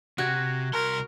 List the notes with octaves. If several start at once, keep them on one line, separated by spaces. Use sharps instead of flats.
C3 F#4 G4 F#6 G#6 A#6
C2 A#4 C6